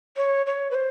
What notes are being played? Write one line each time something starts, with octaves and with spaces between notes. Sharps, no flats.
C#5
C#5
B4
C5